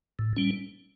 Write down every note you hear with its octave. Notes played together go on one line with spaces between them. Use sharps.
A2
G3 C#4